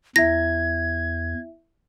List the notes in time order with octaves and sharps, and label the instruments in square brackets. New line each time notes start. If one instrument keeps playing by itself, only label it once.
[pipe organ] E2 [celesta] E4 E5 [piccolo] G#6 [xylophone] A#6